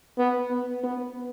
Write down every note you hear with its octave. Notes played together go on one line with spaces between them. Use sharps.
B3
B3
B3